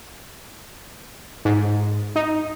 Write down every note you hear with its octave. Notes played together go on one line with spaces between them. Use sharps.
G#2
D#4